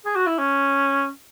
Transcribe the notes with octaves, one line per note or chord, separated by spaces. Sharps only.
G#4
F#4
E4
C#4